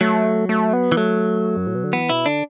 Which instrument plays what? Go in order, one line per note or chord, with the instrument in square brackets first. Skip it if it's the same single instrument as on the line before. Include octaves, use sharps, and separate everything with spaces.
[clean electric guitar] F#3 [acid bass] A3
[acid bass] A3
B3
[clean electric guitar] E3
[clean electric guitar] F#3 [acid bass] A3
[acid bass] F#2
A2
B2
D3
[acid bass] E3 [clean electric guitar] B3
[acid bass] B2 [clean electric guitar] E4
[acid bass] D3 [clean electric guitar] D4